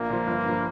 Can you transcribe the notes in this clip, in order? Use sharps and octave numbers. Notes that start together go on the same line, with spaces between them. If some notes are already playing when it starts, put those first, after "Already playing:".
Already playing: A#1 A#3
A#2 F3
G1
G2 F3